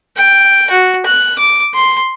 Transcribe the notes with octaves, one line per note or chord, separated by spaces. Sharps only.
G5
F#4
F#6
D6
C6